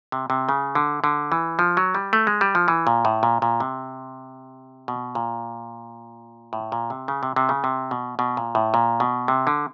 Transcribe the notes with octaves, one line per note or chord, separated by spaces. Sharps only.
C3
C3
C#3
D3
D3
E3
F3
F#3
G3
A3
G#3
G3
F3
E3
A#2
A2
A#2
A#2
C3
B2
A#2
A2
A#2
C3
C#3
C3
C3
C#3
C3
B2
B2
A#2
A2
A#2
B2
C3
D3